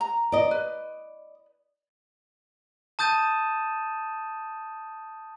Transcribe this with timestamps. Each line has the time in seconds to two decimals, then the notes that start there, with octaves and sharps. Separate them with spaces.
0.01 A#5
0.32 D5 D#5
0.51 B4
2.99 A5 D#6 G6 A6 D#7 E7